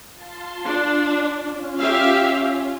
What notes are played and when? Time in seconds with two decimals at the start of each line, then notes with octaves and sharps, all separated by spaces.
0.13 F4 A5 C6
0.65 D4
1.41 C#4 F4
1.78 G4 E5 F5